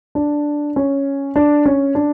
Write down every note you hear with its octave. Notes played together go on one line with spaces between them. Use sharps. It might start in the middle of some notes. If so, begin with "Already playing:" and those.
D4
C#4
D4
C#4
D4